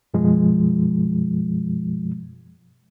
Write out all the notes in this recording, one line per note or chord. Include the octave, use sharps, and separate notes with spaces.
F#2 B2 F3 G#3